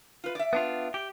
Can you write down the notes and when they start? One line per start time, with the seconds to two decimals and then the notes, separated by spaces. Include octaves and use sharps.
0.24 F4 B4
0.35 D5 E5
0.53 B3 D4 F4
0.94 G4